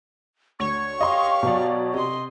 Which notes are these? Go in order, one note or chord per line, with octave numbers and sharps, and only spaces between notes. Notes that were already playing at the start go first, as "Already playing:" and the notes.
D2 C#5 C#6
G4 D#5 F5 C6
B2 F#3 D5
C3 D#5 C6